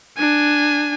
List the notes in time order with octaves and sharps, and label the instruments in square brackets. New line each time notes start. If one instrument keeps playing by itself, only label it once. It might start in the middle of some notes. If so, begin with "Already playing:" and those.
[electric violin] D4 G#5